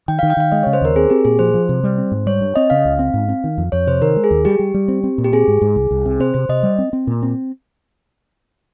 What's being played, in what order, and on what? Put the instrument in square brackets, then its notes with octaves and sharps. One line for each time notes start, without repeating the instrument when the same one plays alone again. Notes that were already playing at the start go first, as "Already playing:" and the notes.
[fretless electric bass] D#3 [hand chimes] G5
[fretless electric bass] D#3 [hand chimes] F5
[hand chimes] G5
[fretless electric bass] D#3 [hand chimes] F5
[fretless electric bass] G#3 [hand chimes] D#5
[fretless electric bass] C#3 [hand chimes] C#5
[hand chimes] C5
[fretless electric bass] D#2 [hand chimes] A#4
[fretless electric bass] C4 [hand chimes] G#4
[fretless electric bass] C4 [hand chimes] G4
[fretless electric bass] A#2 [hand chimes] G#4
[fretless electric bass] F3 [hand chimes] C5
[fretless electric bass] F3
C3
G3
C4
G#2
[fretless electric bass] G3 [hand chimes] C#5
[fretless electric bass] G2
[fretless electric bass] C4 [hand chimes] D#5
[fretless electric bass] C#3 [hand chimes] F5
[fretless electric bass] C#2
C4
G#2
C4
D#3
F2
[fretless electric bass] F2 [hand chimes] C#5
[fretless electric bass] C3 [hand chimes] C5
[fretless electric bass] D#3 [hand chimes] A#4
[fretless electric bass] G#3
[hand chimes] G#4
[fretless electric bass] D#2
[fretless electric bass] G3 [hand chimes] G4
[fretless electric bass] G3
G3
C4
C4
A#2
[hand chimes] G4
[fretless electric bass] C4 [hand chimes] G#4
[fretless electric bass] G#2
G#2
C2
C2
C3
[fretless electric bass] C4 [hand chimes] C5
[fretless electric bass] C3 [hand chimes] C5
[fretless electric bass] C3 [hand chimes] D#5
[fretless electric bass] G3
C4
C4
A#2
C4